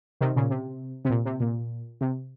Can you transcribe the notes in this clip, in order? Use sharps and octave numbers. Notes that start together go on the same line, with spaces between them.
C3 D#3
A#2 C#3
C3
C3
A#2
C3
A#2
C3